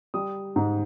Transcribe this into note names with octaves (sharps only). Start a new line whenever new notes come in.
G3 D#6
G#2